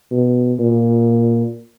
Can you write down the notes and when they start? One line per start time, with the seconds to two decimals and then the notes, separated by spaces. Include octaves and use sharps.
0.11 B2
0.59 A#2